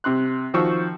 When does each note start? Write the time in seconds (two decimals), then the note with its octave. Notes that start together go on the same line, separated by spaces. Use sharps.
0.04 C3 C6 F#6
0.54 D#3 F3 F#4 C5 C#6 E6